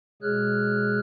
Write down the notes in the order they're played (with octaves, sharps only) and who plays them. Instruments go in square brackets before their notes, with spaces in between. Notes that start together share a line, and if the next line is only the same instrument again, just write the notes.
[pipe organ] B2 G#3 G#4 C#5 F6 F#6